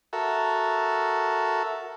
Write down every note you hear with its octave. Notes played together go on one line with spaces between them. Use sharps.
F#4 A4 A#4 E5